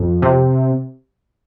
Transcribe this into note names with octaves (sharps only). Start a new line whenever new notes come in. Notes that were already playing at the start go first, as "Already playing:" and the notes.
Already playing: F2
C3